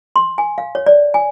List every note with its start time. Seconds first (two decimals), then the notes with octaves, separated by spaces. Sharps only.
0.16 C6
0.38 G#5
0.58 F5
0.75 C#5
0.86 D5
1.14 G#5